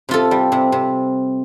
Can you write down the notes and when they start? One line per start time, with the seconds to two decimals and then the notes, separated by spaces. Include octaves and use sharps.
0.09 C3 F4 A4
0.31 G3
0.52 C3
0.72 C3